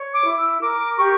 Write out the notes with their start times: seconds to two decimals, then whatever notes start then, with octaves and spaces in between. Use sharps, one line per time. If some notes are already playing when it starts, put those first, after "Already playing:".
Already playing: C#5
0.13 D6
0.24 E4
0.37 E6
0.61 A#4 D6
0.98 G4 C#6